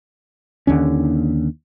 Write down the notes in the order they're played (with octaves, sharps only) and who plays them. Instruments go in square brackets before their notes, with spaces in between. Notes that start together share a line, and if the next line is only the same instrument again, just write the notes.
[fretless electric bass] D#2 D3 C#4